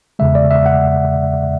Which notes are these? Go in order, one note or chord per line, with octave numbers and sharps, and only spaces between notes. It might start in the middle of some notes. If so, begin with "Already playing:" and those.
E2 C#3 G#3 E5
D5
E5
F#5